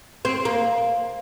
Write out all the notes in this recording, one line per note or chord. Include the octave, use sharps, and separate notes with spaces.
C4
A#3